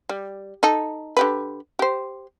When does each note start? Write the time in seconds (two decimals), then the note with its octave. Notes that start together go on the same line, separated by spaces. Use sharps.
0.09 G3
0.63 D#4 A4
1.17 D3 G4 B4
1.79 G4 C5